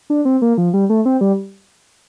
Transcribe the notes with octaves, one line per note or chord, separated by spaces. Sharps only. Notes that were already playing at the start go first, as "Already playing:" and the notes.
D4
C4
A#3
F3
G3
A3
C4
G3